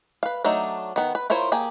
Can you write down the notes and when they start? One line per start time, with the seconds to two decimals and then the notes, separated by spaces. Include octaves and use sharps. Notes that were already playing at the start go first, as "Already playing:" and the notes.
0.23 B4 F5
0.44 F#3 A3 D4 D#4
0.96 D#3 B3
1.15 B4
1.30 E4 F4 A#4 C5 C#5
1.52 A#3 G4 G#4